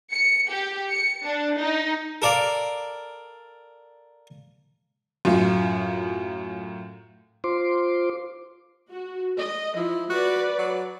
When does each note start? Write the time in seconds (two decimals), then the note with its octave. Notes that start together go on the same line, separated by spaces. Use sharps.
0.12 C#7
0.51 G4
0.92 C#7
1.25 D4
1.60 D#4
2.22 A4 A#4 D5 F5
5.25 F#2 A2 F4
7.44 F4 C5 C6 D6
8.90 F#4
9.38 D#5
9.77 F3 E4
10.10 F#4 B4 D5
10.59 F#3